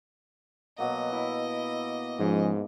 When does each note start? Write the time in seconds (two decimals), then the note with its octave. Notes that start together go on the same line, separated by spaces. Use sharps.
0.78 B2 F#3 A#3 D#5
1.12 E4
2.19 G#2 F3 G#3 C#4